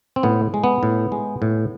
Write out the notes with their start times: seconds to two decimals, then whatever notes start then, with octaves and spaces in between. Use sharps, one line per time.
0.16 C4
0.23 A2 B3
0.54 G#3
0.64 B3
0.83 A2
1.12 G#3
1.42 A2